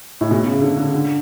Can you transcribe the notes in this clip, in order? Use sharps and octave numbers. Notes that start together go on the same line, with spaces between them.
A2
B2
C#3
D3
D3
D3